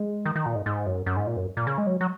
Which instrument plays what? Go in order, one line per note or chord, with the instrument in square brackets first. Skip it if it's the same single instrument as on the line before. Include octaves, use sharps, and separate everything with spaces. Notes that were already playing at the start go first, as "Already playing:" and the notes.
Already playing: [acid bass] G#3
D#3
D#3
A#2
G#2
G#2
F#2
F#2
G#2
A#2
F#2
A#2
C#3
G#3
F#3
F#3